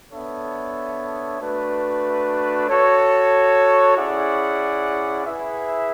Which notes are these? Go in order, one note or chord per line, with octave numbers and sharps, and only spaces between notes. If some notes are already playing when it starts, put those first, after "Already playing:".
B3 D4 A4 C#5 E5
A3 D4 F#4 B4
F#4 A4 C#5
C#4 E4 G#4 D5 F#5
E4 G#4 B4 E5